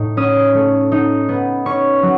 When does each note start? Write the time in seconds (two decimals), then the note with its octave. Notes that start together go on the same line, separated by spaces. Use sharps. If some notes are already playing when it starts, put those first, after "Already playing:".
Already playing: A2 D#4
0.17 C#4 D#6
0.54 A3
0.92 D#4
1.29 B3
1.66 C#4 C#6
2.03 F#3